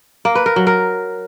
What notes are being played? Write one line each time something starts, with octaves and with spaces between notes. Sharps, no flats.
A#3
B4
A#4
F#3
A#4